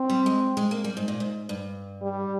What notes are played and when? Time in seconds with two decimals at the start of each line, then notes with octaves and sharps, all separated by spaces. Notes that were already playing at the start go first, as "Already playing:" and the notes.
Already playing: C4
0.10 G3
0.26 G#3
0.57 G#3
0.71 A#3
0.84 G3
0.97 G#2
1.08 A#2
1.20 G#2
1.49 G2
2.02 G3